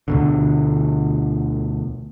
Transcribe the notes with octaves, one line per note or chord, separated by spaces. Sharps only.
D2 B2 D3